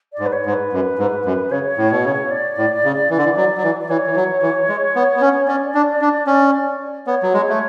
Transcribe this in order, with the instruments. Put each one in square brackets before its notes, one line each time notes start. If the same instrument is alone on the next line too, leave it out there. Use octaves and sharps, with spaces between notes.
[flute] D5
[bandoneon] G#2
[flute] B4
C#5
[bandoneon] G#2
[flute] B4
[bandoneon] F#2
G#2
F#2
[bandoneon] C#3 [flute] C#5
[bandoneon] A2
B2
C#3
[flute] D5
[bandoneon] A2
C#3
E3
D3
E3
F#3
F#3
E3
[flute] D5
[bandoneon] E3 [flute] C#5
[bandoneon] E3
F#3
E3
G#3
B3
B3
C#4
[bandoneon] C#4 [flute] D5
[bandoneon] D4
D4
C#4
[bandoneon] B3 [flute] C#5
[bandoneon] F#3
G#3
A3